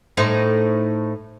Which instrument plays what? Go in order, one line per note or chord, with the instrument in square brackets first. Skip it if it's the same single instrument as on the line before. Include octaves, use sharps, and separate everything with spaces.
[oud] A2 D#4 C5